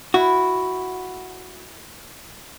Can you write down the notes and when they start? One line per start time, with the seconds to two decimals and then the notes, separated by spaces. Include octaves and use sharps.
0.14 E4 F#4